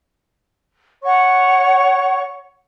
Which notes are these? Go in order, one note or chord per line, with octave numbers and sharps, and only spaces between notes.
C#5 F#5 C#6